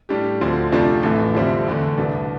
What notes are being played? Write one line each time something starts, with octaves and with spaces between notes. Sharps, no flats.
A2 G3 D4 G4
D2 D3 F3 C4
F2 C3 F3 A3 D4
A1 A2 E3 A3
F2 D3 G3 C4 E4
E2 D3 A3
C2 B2 B3 D4